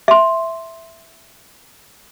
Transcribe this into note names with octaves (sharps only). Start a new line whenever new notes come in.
E5 C6